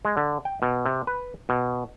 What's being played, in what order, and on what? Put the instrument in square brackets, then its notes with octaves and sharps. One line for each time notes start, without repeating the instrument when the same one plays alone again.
[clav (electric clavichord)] G#3
D3
G5
B2
C3
B4
B2